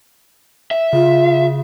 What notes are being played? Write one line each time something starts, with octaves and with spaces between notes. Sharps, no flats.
E5
C#3 F4